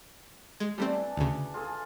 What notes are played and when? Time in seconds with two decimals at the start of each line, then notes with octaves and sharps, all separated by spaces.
0.60 G#3
0.78 E3 G3 A3 C4 D4 A5
1.17 D2 C#3
1.54 F4 G#4 A4